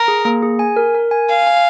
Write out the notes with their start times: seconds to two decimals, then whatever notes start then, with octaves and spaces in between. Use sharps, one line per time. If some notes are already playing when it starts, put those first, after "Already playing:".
Already playing: A#4
0.08 G#4
0.25 A#3
0.43 G#4
0.59 G#5
0.76 A#4
0.95 A#4
1.11 G#5
1.29 F5 G#5
1.47 G#5